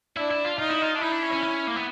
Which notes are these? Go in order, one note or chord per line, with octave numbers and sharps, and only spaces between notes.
D4 E4
E4
F4
D#4 F4
E4
F4
D4
D#4 E4
D4
C#4
C#4
C#4
A#3
B3